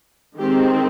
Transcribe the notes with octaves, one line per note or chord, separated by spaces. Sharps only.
D#3 G#3 C4 G4